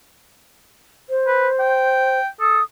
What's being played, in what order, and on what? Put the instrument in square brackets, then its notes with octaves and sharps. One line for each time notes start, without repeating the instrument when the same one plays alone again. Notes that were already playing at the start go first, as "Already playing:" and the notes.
[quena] C5
[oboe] B4
G5
[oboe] A4 [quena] D#6